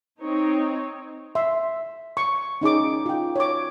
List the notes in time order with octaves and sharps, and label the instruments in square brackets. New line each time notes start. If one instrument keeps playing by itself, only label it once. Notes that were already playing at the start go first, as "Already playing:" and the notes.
[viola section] C4 D#4 C#5
[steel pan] E5 C6
C#6
C#4 D#4 G#4 D6
F4 G5
C#5 D6